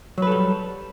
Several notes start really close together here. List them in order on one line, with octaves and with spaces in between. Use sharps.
F#3 B4 A4 G3